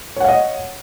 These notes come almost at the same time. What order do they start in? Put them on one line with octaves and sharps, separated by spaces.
C#5 F#5 F5 D#5